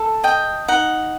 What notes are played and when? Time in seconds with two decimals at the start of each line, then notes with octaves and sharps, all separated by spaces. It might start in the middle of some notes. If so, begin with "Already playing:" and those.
Already playing: A4
0.23 D#5 G5
0.68 D#4 F#5